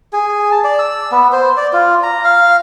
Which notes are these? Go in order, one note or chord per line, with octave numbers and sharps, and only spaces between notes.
G#4
A5
D5
E6
B3
C5
D5
F4
A#5
F5